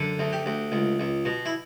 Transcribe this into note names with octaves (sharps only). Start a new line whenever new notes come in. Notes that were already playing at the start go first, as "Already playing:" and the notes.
Already playing: F#2 D3
D2
G4
D2
C#2
C#2
B2
E4